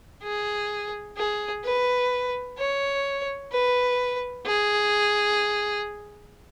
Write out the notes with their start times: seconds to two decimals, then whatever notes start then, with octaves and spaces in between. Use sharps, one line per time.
0.23 G#4
1.17 G#4
1.64 B4
2.58 C#5
3.52 B4
4.46 G#4